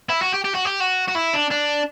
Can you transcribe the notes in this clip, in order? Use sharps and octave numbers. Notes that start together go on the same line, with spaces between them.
E4
F#4
G4
G4
F#4
G4
F#4
F#4
E4
D4
D4